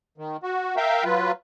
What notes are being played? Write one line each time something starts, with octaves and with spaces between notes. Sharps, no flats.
D#3
F#4
A#4 E5 F5 G5
F#3 F4 B4